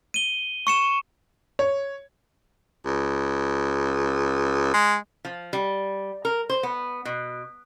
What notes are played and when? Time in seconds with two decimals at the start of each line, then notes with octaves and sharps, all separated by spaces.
0.14 D#7 G7
0.67 C#6 C#7 E7
1.59 C#5
2.86 C#2
4.74 G#3
5.25 F3
5.53 G3
6.25 A#4
6.49 C5
6.63 B3
7.05 B2